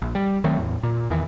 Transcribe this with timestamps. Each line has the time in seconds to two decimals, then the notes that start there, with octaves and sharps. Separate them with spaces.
0.02 A#1
0.15 G3
0.44 D#3 F#3 A3 C4
0.58 E2 A2
0.83 A#2
1.10 E2 D#3 E3